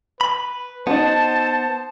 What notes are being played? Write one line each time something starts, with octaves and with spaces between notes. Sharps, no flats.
B4 B5
B3 D#4 F#4 C5 A5